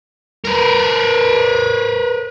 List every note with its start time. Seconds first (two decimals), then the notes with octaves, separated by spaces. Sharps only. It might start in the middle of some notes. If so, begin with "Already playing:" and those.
0.45 A#4 B4